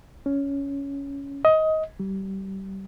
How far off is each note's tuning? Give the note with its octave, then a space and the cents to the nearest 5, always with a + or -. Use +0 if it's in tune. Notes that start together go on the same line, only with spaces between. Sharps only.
C#4 +10
D#5 +20
G3 -25